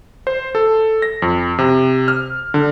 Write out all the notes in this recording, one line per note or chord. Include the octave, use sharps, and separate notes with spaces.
C5
A4
A#6
F2
C3
F6
D3